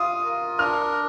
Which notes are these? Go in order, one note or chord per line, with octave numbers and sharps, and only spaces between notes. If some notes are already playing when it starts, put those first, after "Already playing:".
Already playing: F4 F5 D#6
A#4
D4 F6